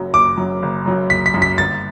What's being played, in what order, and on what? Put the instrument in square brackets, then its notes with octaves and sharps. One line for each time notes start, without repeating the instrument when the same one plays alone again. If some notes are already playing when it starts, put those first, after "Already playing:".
Already playing: [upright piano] F#1 F#2 F#3
[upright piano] F#1 [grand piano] D6
[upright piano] F#2 F#3
F#1
F#2 F#3
[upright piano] F#1 [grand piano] B6
[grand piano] B6
[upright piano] F#2 F#3
[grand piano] B6
[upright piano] G1 [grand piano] A6